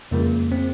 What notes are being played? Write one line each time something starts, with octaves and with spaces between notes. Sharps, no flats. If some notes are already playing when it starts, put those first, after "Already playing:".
F2 C#3 F3 G#3 A#3
C4